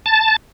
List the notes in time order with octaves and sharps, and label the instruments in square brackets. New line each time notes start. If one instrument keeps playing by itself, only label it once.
[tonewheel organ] A5